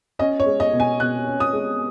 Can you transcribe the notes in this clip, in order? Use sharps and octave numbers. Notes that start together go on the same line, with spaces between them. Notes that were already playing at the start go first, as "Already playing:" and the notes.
C#4 D#5
C#5
G#3
D#5
B2
G#5
B2 F#6
C#4
D#6
G#3